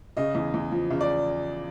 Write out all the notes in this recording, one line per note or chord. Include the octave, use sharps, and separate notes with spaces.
C#3 D#5
E2
E2
F3
C#3
D5